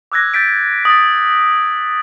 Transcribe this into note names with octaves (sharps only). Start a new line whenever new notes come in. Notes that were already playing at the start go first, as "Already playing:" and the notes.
D6 E6 F#6 G#6 A#6
G6 A6 B6 D7
D#6 A6